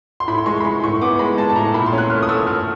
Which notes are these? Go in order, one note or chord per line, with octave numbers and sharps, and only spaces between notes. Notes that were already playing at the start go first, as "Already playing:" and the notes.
C6
A2 B5
C6
G#3 C#6
B5
G#3 C6
A2 C#6
B3 D6
G#3 B5
G#3 A5
A5
A2 A#5
A#2 B5
C6
C#4
F#6
A3 F6
D#6
A3 E6
A3 F6